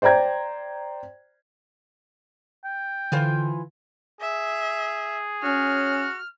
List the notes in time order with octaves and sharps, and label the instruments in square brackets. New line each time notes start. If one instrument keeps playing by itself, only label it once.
[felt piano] C5 D5 G5 A#5 G#6
[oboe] G5
[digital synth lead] D3 [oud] E3 F4 C5
[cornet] G#4 [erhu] E5
[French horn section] C#4 [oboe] F#4 [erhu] F6